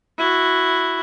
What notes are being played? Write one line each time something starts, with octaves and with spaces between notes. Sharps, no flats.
E4 F#4